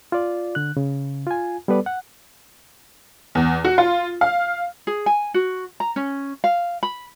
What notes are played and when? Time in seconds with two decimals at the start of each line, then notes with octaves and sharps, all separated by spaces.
0.12 F4 D5
0.55 D3 F#6
0.77 C#3
1.27 F4 G#5
1.68 G3 B3 A4 B4 D5
1.86 F#5
3.35 E2
3.65 F#4
3.78 F4
4.21 F5
4.87 G#4
5.06 G#5
5.34 F#4
5.80 A#5
5.96 C#4
6.44 F5
6.83 B5